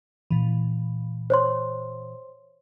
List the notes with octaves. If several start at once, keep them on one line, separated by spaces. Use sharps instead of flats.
A#2 E3
C5 C#5 C6